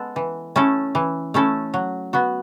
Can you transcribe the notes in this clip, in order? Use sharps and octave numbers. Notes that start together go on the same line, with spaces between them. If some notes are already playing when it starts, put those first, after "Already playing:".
Already playing: G#3 B3 A4
E3
A3 C#4 E4 A4
E3
A3 C#4 E4 A4
F#3
B3 F#4